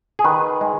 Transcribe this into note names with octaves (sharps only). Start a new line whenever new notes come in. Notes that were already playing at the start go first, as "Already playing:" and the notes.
G#4
D#3 B4
G#3